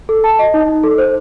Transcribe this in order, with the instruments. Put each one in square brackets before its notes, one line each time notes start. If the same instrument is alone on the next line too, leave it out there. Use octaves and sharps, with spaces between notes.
[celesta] A4
A5
D#5
D#4
D#4
A4
C5